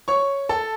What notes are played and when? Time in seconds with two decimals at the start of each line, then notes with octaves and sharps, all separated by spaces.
0.08 C#5 C#6
0.49 A4 A5